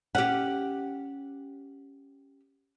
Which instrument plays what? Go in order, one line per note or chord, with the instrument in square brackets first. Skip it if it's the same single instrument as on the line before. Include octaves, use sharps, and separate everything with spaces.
[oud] C#4 G4 [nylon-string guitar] F#5